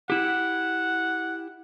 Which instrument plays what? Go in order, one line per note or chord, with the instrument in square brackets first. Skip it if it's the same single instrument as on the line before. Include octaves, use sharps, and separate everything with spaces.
[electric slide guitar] E4 G4 [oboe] F#5